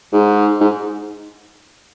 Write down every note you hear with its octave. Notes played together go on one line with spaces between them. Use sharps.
G#2
G#2